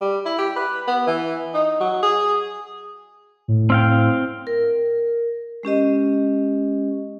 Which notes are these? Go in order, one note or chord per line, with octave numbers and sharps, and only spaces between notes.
G3
E4
G4
B4
B3
E3
D#4
F#3
G#4
A2
C4 F5 G5
A#4
G#3 C#4 G4 D#5